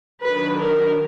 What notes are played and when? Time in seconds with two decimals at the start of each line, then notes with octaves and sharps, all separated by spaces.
0.22 D#3 F#3 D4 B4
0.60 A#4